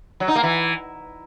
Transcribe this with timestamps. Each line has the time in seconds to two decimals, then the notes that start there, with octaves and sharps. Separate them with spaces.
0.20 F#3
0.28 D#4
0.36 A#3
0.43 E3